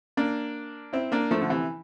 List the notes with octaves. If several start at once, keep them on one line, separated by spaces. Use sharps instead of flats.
A#3 D4
C4 E4
A#3 D4
F3 A3
D3
C3 E3